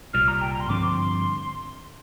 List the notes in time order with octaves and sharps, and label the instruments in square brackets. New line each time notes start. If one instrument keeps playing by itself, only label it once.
[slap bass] C2 A#2 G3 [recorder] F6
[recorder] A#5
G5
A#5
C6
[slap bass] G2 D3 F3 C4 [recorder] D6
[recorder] C6